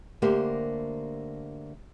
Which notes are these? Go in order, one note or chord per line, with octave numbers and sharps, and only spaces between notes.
D3 A3 A#3 G4 A#4 C5